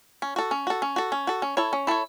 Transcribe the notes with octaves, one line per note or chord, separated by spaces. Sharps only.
C#4
F#4 A4
C#4
F#4 A4
C#4
F#4 A4
C#4
F#4 A4
C#4
E4 A4 C#5
C#4
E4 A4 C#5